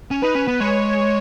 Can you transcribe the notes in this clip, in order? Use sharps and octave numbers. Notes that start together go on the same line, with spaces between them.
C#4
D#4 B4
C#4
B3
G#3 C#5